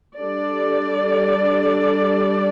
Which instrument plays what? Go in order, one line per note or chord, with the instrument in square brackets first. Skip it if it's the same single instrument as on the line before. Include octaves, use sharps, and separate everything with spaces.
[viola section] G3 D4 A4 D5